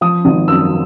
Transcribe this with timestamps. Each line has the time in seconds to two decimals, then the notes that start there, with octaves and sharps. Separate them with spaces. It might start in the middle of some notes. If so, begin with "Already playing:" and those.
0.01 F3 D#6
0.25 G#1
0.48 F#2 E6